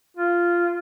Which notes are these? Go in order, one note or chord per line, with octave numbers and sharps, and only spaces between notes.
F4